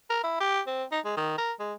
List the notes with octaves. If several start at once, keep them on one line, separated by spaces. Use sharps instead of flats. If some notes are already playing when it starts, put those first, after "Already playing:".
A#4
E4
G4
C4
D#4
G#3
D#3
A#4
G#3